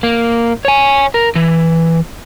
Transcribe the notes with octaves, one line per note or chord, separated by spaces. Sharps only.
A#3
C#5 G#5
A#4
E3